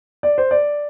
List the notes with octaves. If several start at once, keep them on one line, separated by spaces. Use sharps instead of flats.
D5
C5
D5